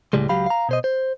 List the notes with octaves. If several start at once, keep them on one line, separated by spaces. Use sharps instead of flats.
C#2 A2 C#3 G3 G#3
C#2 F#3 G4 F5 B5
F5 A#5
B2 C5 D#5
C5